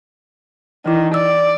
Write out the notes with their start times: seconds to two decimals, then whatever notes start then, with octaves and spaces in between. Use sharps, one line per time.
0.86 D#3 E3 E4
1.14 D5 E6